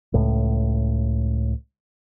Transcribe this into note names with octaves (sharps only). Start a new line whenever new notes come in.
C#2 A2